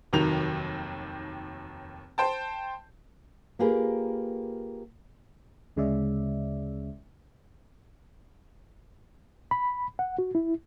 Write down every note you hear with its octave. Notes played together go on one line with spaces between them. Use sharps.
F1 D#2 D#3 F#3 F7
C5 G5 A5
A#3 F4 G4 G#4 A#4 B4
D2 C#3 G#3 C#4 D5 E5
B5
F#5
F#4
E4